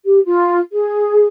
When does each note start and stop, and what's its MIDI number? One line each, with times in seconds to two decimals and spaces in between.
0.05 0.20 67
0.25 0.59 65
0.72 1.26 68